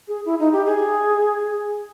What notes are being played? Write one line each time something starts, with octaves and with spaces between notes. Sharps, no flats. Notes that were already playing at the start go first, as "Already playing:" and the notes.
G#4
E4
D#4
G4
G#4